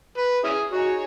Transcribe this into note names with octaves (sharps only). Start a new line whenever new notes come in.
B4
C#4 E4 G#4
D#4 F#4 G#4 C#5